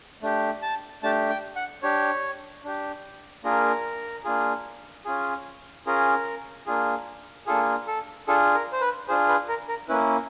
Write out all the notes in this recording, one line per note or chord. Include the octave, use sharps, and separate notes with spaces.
A3 D4 G4
A5
A3 D4 G4 A5
G5
F#5
D4 G4 C#5
D4 G4
A#3 D4 F4 G#4 A#4
A#3 D4 F4 G#4
C#4 F4 G#4
C#4 F4 G#4 A#4
A#3 D4 F4 G#4
A#3 D4 F4 G#4 A4
A4
D4 F4 G#4 A4
A#4
C5
B4
D4 F4 G#4 C5
B4
A#4
A#4
A#3 C#4 E4 B4